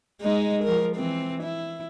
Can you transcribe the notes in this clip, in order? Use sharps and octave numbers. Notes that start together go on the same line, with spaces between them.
G#3 D#4
F3 A#4
E3 C4
E4